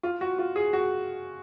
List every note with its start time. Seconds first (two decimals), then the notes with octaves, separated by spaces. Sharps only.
0.03 F4
0.21 F#4
0.38 F4
0.56 G#4
0.73 F#4